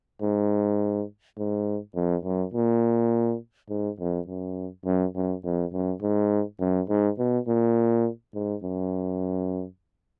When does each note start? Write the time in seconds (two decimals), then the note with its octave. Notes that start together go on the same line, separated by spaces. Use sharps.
0.22 G#2
1.38 G#2
1.95 F2
2.25 F#2
2.54 A#2
3.69 G#2
3.99 F2
4.27 F#2
4.85 F#2
5.15 F#2
5.45 F2
5.73 F#2
6.02 G#2
6.60 F#2
6.89 G#2
7.18 B2
7.48 A#2
8.34 G#2
8.63 F#2